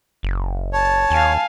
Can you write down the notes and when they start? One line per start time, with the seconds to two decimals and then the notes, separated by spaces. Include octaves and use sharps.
0.23 F#1
0.73 C#5 A5
1.11 D#2 F5 G#5